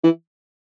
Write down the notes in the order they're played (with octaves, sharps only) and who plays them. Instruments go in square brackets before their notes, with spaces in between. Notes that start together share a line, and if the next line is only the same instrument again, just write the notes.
[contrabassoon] E3